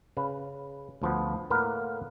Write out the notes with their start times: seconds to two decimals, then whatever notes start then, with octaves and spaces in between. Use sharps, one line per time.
0.17 C#3 B4
1.02 D2 F3 B3
1.50 A2 A#3 A#4 B4 F#5